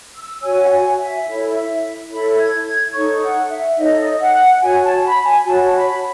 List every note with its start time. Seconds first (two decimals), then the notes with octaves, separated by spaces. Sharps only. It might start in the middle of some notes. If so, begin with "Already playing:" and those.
0.14 E6
0.42 F#4 C#5 G#5
0.66 F#5
0.70 G#5
0.98 E5
1.26 E4 A4 C#5
1.54 E5
2.10 E4 A4 C#5 B5
2.38 G#6
2.66 G#6
2.93 D#4 A4 C#5 C#6
3.22 F#5
3.50 E5
3.78 D#4 A4 C#5 D#5
4.20 F#5
4.62 F#4 C#5 G#5
4.83 A5
5.04 B5
5.25 G#5
5.46 F#4 C#5 A5
5.74 B5